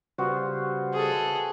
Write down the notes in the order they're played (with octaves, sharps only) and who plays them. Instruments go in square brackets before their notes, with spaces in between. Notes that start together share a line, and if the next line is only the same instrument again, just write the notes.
[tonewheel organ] C#3 G3 C5 [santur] B3 F4 F#4
[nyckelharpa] G#4 A4 [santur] D#5 G#5